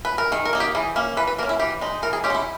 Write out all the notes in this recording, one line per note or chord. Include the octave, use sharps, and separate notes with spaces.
B4
A#4
D#3 G#4
A#4
A#3 D#4
G4
E3 G#4
A#3 C#4
E3 B4
B4
A#3 C#4 A#4
E4
E3 G4
G#3 D#4
E3 A#4
G#4
G#3 C#4 G4
D#4
E4